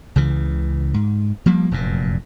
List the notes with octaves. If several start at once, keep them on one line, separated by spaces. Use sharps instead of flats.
C#2 C#3 E3
G#2
F3 G3 A#3
F1 F#2 A#2